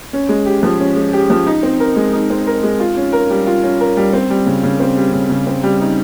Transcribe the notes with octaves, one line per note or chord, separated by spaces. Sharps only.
C#4
G#3
G4
F3
C#4
G#3
G4
F3
D#4
C4
A#4
G#3
D#4
C4
A#4
G#3
F4
C#4
A#4
G3
F4
C#4
A#4
G3
C4
G3
C#3
C#3
C4
G3
C#3
C#3
C4
G3
D#4